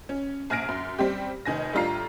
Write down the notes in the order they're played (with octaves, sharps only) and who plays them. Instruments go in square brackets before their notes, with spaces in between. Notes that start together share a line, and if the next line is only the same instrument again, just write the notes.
[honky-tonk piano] C#4
A#1 G#5 F6 A#6 D7
F#2
G3 C4 G4
F1 D#3 G#5 A#6
A2 G3 D4 F4 A#5 C7